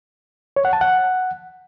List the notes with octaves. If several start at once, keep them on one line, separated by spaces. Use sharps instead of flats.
C#5
F#5
A5
F#5